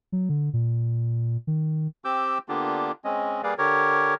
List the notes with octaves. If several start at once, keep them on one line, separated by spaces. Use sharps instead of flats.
F#3
D3
A#2
D#3
C4 G4 D6 E6 G6
D3 A#3 B3 D4 F4 G4
G#3 C4 C#4 D#5
G3 A#3 G#4 B4 D5 F5
D3 G4 A#4 C#5